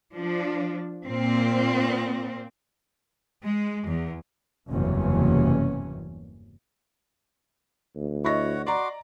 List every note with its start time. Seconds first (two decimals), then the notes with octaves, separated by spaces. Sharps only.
0.15 F3 D4
1.06 A#2 A#3 C4
3.44 G#3
3.87 E2
4.70 F#1 E2 G2 C3 E3 C#4
7.96 D2
8.25 E4 F#4 C#5 D#5 E5 F#5 A#6
8.67 F#4 D5 A#5 C6 D6